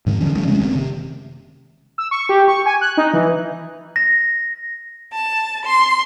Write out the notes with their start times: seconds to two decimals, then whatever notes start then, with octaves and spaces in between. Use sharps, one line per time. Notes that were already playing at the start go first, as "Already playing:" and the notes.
0.06 G#2 D#3
0.21 D3 E3 F3 C#4
0.35 D2 G3 A3 C#4
0.47 C3 G#3 A#3 C#4
0.59 F#1 D#3 C4
0.75 C3
1.98 E6
2.11 C#6
2.29 G4
2.48 C#6
2.66 G#5
2.81 F#6
2.97 D#4
3.14 E3
3.96 A#6
5.13 A5
5.65 C6